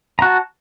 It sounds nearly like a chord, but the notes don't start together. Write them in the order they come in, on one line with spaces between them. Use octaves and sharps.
A#5 F#4 A5